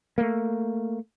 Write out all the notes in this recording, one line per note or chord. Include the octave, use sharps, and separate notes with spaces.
A3 A#3